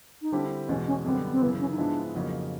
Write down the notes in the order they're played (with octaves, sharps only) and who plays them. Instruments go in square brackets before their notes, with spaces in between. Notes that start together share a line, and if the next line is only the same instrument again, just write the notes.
[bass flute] D#4
[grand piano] D3 G3 C4 E4 G4 [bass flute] D4
[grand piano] E2 B2 G#3 [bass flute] C#4
[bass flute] C#4
[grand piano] F#2 D3 G3 B3 [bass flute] C4
[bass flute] C4
[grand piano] F#2 C#3 E3 [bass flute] B3
[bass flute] C#4
D#4
[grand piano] G#2 F3 G#3 B3 E4 [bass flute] D4
[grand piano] F2 C#3 F#3 A#3 D#4